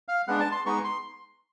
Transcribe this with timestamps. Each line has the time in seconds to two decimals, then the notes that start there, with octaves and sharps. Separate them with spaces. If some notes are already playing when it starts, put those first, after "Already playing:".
0.08 F5
0.28 G#3 B3 D4 F#5
0.40 A5
0.52 C6
0.65 G#3 B3 D#4 C#6
0.84 C6